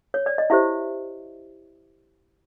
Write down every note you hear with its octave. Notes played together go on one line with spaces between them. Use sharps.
C#5
D5
D#5
E4 G4 C5 E5